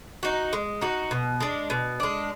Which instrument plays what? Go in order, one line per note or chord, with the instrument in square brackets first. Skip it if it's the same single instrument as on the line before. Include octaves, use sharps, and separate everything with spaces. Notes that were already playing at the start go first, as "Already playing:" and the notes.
[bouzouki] D#4 F#4
G#3
D#4 F#4
B2
G#3 D4
B2
G#3 D4